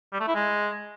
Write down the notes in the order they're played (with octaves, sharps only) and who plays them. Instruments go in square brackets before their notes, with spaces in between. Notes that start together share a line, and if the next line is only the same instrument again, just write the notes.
[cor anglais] G3
A3
E4
G#3